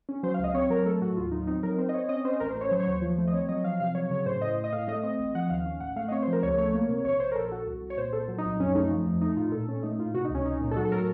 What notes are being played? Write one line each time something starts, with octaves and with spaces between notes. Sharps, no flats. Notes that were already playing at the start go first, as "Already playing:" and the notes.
C#4
F#3 C5
F5
C#2 D#5
C4 C#5
F#3 A#4
A3 A4
A2 F#4
D#2 F4
F#3 D#4
C4 D#4
F#3 A#4
C4 C5
D#5
C4 C#5
C#4 D#5
C#4 C5
A1 A#4
C5
A1
C#5
F#3 C5
C#5
D#2 C5
F3
A3
D#5
C4 C#5
F#3 D#5
F3 F5
C3 F5
F#3 C#5
C#3 C#5
A2 C5
A2 D#5
A2
D#5
A2 F5
A3 D#5
C4 D#5
A1 D#5
F3 F#5
D#2 F5
C#4
A1 F#5
A3 F5
D#5
C4 C#5
C5
F3
A#4
C#2 C#5
A3 C#5
A#3
C3
A#1 C#5
A#1 C5
A#4
A#1 A4
A#1 F#4
C2
C2
C#5
A#2 C5
A#2 A4
F#3
D#4
C2
D#4
F#2 C#4
A3 D#4
F3
F2
A3 D#4
A2 F4
A#2 A4
A#2 C#4
A3 D#4
A2 F4
C3 F#4
D#4
C#2 C#4
C#4 D#4
A#2 D#4
A4
F#3 F#4
A4
A2 A#4